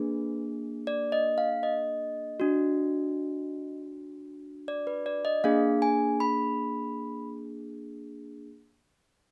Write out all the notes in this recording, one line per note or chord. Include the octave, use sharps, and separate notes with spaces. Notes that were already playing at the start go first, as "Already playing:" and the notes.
Already playing: A#3 D4 G#4 B4
D5
D#5
F5
D#5
D4 F#4
D5
B4
D5
D#5
A#3 D4 G#4 F5
G#5
B5